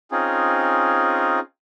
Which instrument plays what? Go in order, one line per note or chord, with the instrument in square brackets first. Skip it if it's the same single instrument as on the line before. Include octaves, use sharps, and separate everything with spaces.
[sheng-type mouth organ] C4 C#4 D#4 F4 G#4